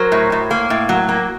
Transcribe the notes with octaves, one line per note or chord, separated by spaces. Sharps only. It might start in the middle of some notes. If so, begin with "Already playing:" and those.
Already playing: F#3 A#4 C5
A2
A2
A#3
A2
F#3
A#3